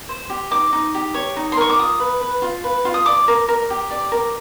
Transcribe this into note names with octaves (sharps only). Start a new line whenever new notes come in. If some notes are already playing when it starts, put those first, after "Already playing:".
C5
G4
D#4 D6
D#4
G4
C#5
D#4
C6
A#4 C#6
D6
F4 D#6
B4
B4
F4
B4
F4
D#6
D5 D6
A#4
A#4
G4
D5
A#4